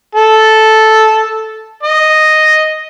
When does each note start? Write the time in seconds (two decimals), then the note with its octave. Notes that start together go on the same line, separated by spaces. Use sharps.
0.15 A4
1.83 D#5